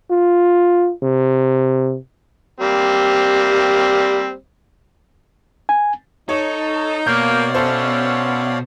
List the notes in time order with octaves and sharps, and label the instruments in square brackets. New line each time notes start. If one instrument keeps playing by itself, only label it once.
[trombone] F4
C3
[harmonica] G3 A#3 C4
[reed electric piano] G#5
[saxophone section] D#4 [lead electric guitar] A4 [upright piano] C#5
[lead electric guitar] B2 [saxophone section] A#3 [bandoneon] C#5 D5 F5 [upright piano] G6
[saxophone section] B3 C#4 E5 [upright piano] A4 C5